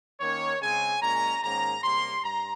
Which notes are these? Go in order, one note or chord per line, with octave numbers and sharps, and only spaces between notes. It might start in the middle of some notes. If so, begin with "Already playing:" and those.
D#3 A#3 C#4 C#5
C#3 G#3 C4 G#5
A#2 G#3 C#4 A#5
G#2 D#3 A#3 C#4 A#5
C3 G3 A#3 C6
G2 A#5